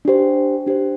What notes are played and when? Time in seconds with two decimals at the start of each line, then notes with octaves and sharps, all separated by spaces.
0.05 D4 G4 C5
0.66 D4 G4 C5